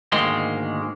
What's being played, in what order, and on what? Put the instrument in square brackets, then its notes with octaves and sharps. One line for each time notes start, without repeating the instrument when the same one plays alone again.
[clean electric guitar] D2 G#2 D#3 G#3 A#3